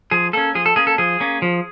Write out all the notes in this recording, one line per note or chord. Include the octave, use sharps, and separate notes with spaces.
F3 G#4
A#3 C#4 A4
F3 G#4
A4
A#3 C#4 G#4
A4
F3 G#4
A#3 C#4
F3